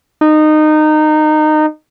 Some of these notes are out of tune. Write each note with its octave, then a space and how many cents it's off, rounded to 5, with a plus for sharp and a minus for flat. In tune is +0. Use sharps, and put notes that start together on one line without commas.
D#4 -20